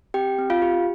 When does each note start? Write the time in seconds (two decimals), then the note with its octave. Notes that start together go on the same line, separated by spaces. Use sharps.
0.14 C4 G4 G5
0.39 C4
0.50 F4 F5
0.62 G4